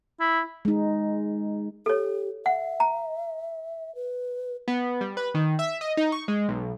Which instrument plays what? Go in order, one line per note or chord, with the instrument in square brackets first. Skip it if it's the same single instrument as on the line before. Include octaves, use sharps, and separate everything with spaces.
[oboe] E4
[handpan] G#3 D#4
[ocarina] G4 [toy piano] A4 C#5
[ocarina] E5 [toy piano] F#5
[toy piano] A#5
[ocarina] B4
[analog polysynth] B3
G3
B4
D#3
E5
D#5
D#4
C#6
G#3
B1